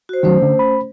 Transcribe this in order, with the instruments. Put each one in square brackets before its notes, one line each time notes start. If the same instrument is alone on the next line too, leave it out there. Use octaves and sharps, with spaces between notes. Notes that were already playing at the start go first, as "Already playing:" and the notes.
[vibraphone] F#4 C5
[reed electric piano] D#3 F#3 [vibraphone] A3 C#4 C5
[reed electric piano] D3
B5